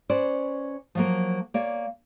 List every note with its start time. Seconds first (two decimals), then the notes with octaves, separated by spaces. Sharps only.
0.09 C#4 B4 C5 D5
0.95 F3 F#3 A#3
1.54 A#3 C#5 D5